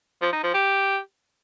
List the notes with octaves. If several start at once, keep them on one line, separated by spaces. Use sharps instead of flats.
F3
D#4
F3
G4